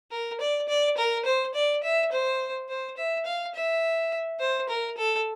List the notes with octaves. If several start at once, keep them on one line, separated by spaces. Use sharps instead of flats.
A#4
D5
D5
A#4
C5
D5
E5
C5
C5
E5
F5
E5
C5
A#4
A4